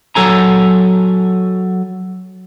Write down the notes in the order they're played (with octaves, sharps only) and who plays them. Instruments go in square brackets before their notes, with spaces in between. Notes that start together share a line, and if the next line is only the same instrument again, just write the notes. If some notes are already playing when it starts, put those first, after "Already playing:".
[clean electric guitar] F#3 A4 G#5 A#5